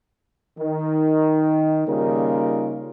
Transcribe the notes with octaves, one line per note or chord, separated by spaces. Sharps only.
D#3
C#3 G3 A#3 D#4 F4 A#4